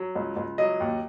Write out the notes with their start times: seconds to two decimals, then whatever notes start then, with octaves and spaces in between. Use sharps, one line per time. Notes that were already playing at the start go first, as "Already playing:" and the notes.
Already playing: F#3
0.16 C#2
0.36 C#2
0.58 F#3 D#5
0.80 D#2